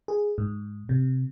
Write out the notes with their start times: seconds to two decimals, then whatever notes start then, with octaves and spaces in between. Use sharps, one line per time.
0.08 G#4
0.38 G#2
0.89 C3